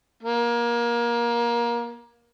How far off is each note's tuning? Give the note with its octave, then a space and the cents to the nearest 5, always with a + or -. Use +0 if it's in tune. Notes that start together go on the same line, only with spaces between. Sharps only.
A#3 +25